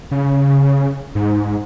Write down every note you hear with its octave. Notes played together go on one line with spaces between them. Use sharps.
C#3
G#2